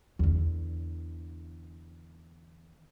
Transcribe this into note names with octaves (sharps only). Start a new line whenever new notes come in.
E2 D3